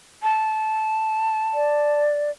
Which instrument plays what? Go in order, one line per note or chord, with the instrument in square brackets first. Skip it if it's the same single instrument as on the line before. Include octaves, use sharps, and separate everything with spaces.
[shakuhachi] A5
[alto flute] D5